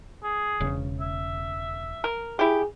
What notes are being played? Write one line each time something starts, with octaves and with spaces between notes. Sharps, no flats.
G#4
E1 C#3
E5
A#4
E4 G4 G#4